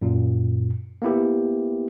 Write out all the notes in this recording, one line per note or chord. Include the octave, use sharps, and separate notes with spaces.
F#2 A#2
A#3 B3 E4 G4